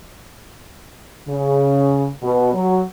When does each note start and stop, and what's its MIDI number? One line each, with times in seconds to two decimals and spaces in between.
1.28 2.09 49
2.23 2.51 47
2.54 2.82 54